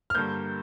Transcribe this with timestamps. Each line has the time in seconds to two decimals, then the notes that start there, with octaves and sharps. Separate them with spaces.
0.10 F6
0.15 G2 D3 G3 A#3 G6